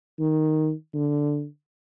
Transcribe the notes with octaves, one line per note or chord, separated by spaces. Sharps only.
D#3
D3